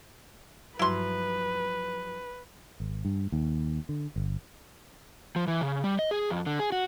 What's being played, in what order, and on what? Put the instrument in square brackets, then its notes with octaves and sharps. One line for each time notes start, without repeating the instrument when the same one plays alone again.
[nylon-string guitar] G2 F3 F#3 [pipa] E4 C6 [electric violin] B4
[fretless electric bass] G#1
G2
D#2
D3
G1
[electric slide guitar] F3
E3
C#3
G3
D#5
G#4
F2
D3
G#4
F#4